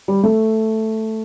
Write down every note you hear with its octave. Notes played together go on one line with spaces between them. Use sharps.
G3
A3